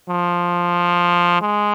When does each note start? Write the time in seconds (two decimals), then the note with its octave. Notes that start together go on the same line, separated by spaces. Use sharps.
0.10 F3
1.42 G#3